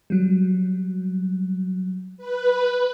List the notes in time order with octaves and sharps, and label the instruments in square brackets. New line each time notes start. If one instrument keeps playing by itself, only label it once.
[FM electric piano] F#3 G3
[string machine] B4